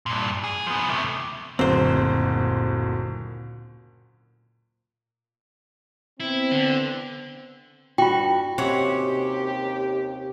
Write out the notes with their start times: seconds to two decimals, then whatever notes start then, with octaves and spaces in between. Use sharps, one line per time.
0.06 G2 A#2
0.44 G#4
0.67 F3 B3
0.90 C3 A3
1.59 F#1 D2 A#2 C4 C5
6.20 B3 C4 E4
6.52 D3
7.98 G2 F4 F#4 G5
8.58 D#2 C3 C#4 G4 F#5